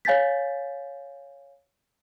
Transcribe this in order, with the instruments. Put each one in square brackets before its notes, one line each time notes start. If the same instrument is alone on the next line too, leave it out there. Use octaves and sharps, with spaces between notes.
[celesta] C#5 F5 G#5 G6 A6 B6